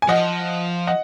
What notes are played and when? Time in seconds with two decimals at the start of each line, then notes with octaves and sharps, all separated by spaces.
0.02 G#5
0.08 F3 D#5 F#5
0.87 D#5 F#5